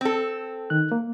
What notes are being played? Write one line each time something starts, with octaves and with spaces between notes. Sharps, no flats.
C4 A4
D#3 F#6
A#3